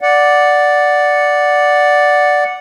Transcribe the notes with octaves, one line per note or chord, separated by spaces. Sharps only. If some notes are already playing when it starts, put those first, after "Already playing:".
D5 F#5